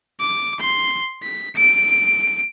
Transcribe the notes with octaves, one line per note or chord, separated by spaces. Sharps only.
D6
C6
B6
D7